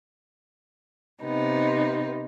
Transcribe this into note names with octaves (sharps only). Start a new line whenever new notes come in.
C3 B3 D#4